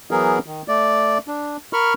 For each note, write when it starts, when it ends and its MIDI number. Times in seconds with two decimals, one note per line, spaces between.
0.11 0.39 52
0.11 0.39 54
0.11 0.39 59
0.11 0.39 68
0.11 0.39 70
0.46 0.62 51
0.68 1.18 57
0.68 1.18 74
1.28 1.57 62
1.73 1.94 70
1.73 1.94 83
1.73 1.94 85
1.73 1.94 89